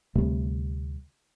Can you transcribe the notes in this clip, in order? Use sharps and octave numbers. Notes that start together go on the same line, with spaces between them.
D2 C3 G3 A3